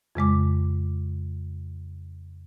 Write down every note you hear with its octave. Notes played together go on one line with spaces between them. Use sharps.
F2 C#3 G#3 D6